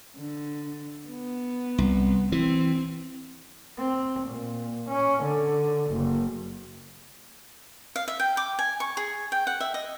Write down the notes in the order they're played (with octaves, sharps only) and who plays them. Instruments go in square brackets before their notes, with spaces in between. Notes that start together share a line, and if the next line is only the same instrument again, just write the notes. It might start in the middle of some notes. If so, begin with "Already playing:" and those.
[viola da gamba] D3
B3
[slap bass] C2
[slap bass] E3 [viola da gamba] C4
[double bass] C4
A#2
C#4
D3
F#1
[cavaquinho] F5
E5
G5
D6
G#5
C#6
G#4
G5
F#5
E5
D#5